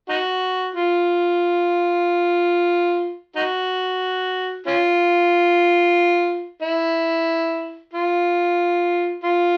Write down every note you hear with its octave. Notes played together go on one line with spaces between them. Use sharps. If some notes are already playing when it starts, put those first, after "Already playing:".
D#4 F#4
F4
D#4 F#4
C#4 F4
E4
F4
F4